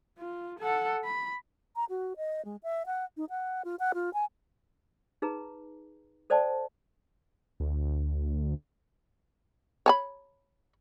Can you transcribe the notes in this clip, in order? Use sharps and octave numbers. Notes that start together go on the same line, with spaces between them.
F4
A4 F#5
B5
A#5
F#4
D#5
G#3
E5
F#5
D#4
F#5
F4
F#5
F4
G#5
D#4 G#4 B4 A#5
A4 C5 D5 G5 A5
D2
C#5 A5 B5